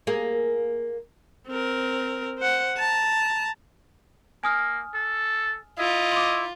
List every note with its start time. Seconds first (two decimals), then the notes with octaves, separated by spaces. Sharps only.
0.07 A#3 G#4
1.48 C4 A#4
2.38 C5 F#5
2.77 A5 A#5
4.44 A#3 G#5 D#6 F6
4.94 A4
5.79 E4 F4 D#5
6.12 C6 D6